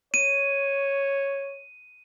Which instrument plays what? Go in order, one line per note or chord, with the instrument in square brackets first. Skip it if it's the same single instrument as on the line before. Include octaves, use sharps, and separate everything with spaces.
[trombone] C#5 [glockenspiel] D#7